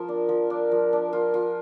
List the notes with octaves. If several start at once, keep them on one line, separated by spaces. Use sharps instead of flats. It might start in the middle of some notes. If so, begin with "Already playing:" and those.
Already playing: F3 F4 A#4
D4
F3
D4
F3
D4
F4
F4